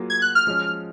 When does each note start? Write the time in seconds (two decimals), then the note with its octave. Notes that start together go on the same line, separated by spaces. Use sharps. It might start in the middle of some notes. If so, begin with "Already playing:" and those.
Already playing: F#3 A#3 F4 G#4
0.10 G#6
0.22 F#6
0.35 F6
0.47 F3 G#3 C#4